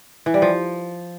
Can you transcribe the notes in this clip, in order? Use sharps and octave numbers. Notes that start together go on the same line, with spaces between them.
E3
G3
F3